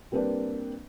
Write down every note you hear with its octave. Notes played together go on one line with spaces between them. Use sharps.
G3 A#3 C4 D4 B4 D5